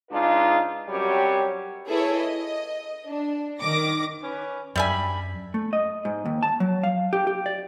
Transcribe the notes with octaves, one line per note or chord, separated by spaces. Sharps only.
C#3 G#3 D4 D#4 F4 B4
F#2 F#3 G3 C4 G4 C#5
E4 G#4 A4 B4 C#5
D#5
D4
D#3 D6 A#6
C#4 B4
F#2 G3 D4 E5 G#5 B5
A3
D#5
G#2
D#2
A5
F#3
F5
G4
G4
D5